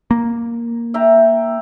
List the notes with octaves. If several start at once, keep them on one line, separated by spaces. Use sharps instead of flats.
A#3
E5 G5 A#5